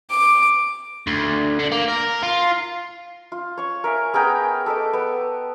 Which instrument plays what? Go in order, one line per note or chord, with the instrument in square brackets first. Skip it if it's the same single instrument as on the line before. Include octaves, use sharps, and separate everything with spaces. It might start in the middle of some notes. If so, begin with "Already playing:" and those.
[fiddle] D6
[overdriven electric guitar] D2
D3
A#3
A#4
F4
[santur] F4
C#5 C#6
A#4 E5 G#5
B3 G#4 A#4 G5
A4 B4 D#5 D6
B3